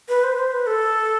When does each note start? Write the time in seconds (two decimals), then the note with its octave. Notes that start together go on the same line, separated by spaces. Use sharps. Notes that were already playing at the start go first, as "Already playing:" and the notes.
0.09 B4
0.24 C5
0.32 B4
0.39 C5
0.52 B4
0.67 A4